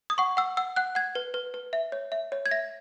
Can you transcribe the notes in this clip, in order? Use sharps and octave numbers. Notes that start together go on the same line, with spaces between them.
D#6
F#5 C#6
F#5 E6
F#5 E6
F#5 F#6
F#5 G#6
B4
B4
B4
E5
C#5
E5
C#5
G#6
E5 A#6